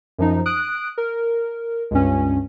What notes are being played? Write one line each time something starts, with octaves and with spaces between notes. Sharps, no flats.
F#2 F3 D#4
D#6 F#6 D7
A#4
C#2 G2 C#4